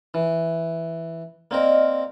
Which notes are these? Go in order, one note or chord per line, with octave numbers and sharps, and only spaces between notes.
E3
A#3 C4 A#4 D5 D#5